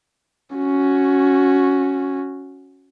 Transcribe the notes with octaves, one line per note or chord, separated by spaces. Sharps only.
C#4 F#4